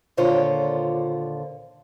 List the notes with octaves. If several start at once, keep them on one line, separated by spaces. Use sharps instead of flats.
D#2 A#2 D3 F4 C5 C#5